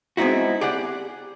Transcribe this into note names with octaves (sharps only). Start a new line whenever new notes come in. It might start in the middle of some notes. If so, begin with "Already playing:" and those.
G#3 B3 C4 D#4 E4 F#4
G4 G#4 D5 F#5